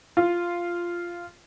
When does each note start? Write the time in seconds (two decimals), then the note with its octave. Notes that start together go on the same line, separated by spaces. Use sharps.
0.17 F4